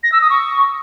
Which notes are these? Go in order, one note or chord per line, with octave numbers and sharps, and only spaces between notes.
A#6
E6
D#6
C#6